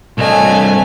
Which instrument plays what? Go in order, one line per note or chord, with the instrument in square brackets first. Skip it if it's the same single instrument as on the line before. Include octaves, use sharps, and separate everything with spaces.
[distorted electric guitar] C2 D#5 [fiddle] A3 G#5